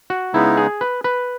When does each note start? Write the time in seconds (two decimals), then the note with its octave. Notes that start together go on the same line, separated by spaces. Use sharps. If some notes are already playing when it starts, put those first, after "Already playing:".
0.10 F#4
0.34 C#3 G#3 B3 D#4 E4
0.57 G#4
0.81 B4
1.04 B4